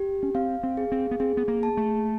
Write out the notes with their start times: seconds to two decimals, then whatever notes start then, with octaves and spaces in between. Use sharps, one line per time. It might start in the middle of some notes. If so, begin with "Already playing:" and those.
Already playing: G4
0.23 C#4
0.35 C4 F5
0.63 C4
0.77 G#4
0.92 C4
1.11 B3
1.20 C4 G#4
1.37 B3
1.48 A#3
1.63 A5
1.77 A3